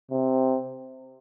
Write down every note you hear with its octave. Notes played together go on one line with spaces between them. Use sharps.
C3